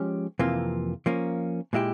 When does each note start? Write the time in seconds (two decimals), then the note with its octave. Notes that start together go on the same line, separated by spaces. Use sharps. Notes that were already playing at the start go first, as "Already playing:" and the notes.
Already playing: F3 G#3 C#4 G4 C#5
0.39 F2 C3 E3 A#3 F4
1.06 F3 A#3 C#4
1.73 A#2 G#3 E4 G4